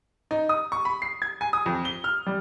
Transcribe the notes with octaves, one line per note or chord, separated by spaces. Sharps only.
D#4
D#6
C#6
B5
C7
G#6
G#5
D#6
F2
G7
F6
G3